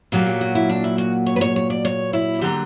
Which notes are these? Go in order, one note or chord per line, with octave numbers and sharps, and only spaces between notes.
A#2 F#3 A#3 G4
G4
F#4
E4
D4
E4
F#4
C#5
B4
C#5
C#5
D5
C#5
E4
D3 F#3 A#3 G4